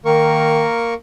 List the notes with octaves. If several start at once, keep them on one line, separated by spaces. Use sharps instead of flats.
D#3 A#3 A#4 C#6